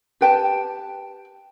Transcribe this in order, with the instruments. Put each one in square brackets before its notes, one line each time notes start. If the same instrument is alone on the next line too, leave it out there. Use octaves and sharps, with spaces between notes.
[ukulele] G4 B4 G5 A5